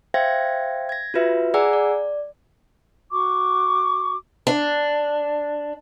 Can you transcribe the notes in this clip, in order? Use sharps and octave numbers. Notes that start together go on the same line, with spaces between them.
C5 E5 F5 G5 G#6 A#6
G#6 A#6
F4 F#4 B4 E5
G#4 D5 F#5 G#5 A#5 E6
D5
F#4 C#6 D6
D4